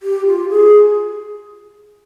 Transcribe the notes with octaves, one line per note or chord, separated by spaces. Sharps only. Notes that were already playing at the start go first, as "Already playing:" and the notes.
G4
F4
G#4